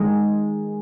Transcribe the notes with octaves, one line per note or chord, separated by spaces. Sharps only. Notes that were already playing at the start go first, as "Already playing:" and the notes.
Already playing: D#3 G#3